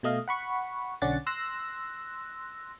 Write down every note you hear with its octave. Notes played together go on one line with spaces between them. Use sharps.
B2 A3 D#5 F5
F#5 B5 C#6
B1 D3 C#4 D5 F#5 A6
C6 E6 F#6 A#6